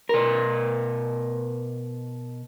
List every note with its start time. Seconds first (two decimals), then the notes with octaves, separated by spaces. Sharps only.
0.09 B2 A#4